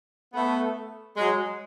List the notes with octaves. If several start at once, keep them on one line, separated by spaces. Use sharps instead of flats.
A3 B3
F#3 G#3